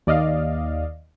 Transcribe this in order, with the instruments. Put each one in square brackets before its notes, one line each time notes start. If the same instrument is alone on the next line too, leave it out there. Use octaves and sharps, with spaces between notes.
[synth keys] D#2 D5 D#5 F5